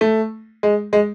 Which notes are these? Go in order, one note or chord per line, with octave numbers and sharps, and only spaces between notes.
A3
G#3
G#3